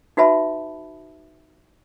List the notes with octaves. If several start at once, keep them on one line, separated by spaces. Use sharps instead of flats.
D#4 F#4 B4 E5 A5 B5